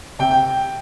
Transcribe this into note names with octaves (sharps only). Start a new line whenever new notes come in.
C3 G5
G5